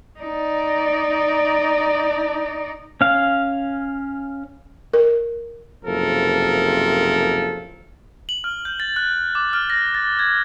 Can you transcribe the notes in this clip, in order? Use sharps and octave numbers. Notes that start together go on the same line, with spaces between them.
D#4 D5
C#4 F5
A#4
F#1 C3 F3 A4 A#4
F#7
F6
G6
A6
F#6
D6
F6
A#6
A6
G#6